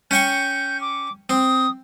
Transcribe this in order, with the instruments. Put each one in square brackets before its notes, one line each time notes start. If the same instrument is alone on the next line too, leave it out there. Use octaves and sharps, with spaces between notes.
[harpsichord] C#4 G5 C#6 [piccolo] G6
[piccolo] D6
[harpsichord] C4 [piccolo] D#6